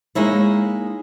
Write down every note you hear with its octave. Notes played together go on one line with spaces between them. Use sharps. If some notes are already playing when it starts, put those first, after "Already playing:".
G#3 A#3 D#4 E4 C#5